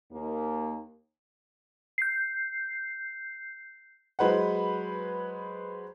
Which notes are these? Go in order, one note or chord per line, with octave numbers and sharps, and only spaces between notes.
D#2 A#3
G6 C7
F#3 G#3 B4 C5 F#5